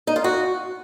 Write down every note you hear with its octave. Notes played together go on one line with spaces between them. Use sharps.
D#4
F4
F#4